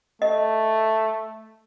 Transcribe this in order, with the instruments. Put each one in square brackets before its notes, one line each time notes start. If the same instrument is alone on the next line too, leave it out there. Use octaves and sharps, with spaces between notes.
[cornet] A3 [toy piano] D#5